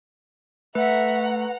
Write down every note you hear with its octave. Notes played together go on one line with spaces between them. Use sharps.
A3 B4 E5 F#5 A#5